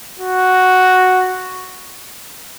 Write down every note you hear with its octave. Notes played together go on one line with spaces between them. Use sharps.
F#4